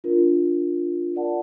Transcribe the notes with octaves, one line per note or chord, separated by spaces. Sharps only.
D4 F4 A#4
F4 A#4 D5 F#5 A5